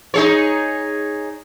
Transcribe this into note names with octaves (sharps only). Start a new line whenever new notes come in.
D#4 G#4 C#5